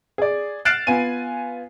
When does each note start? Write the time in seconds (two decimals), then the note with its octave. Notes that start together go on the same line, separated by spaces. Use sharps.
0.18 G#4 D5
0.65 F6 F#6 A6 C7 D7 E7
0.87 B3 F4 G#5 D#7